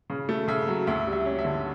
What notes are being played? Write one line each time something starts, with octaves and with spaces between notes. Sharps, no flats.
C#3
A3
C#3 E5
F#3
D2 E5
G3
E5
C#4
E5
D3